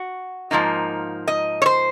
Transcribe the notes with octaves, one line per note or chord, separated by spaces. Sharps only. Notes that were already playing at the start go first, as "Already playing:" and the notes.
Already playing: F#4
G#2 F3 A#3 D#4
D#5
C#5
C5